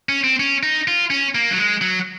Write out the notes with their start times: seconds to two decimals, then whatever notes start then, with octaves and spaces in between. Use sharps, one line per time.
0.09 C#4
0.24 C4
0.40 C#4
0.63 D#4
0.88 F4
1.10 C#4
1.35 A#3
1.51 F#3
1.58 G#3
1.81 F#3